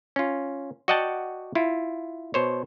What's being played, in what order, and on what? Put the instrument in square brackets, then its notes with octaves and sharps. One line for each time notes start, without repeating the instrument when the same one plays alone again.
[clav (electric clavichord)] C#4 F4
F#4 D5 D#5 F#5 G5 A5
E4 F4
B2 C5 C#5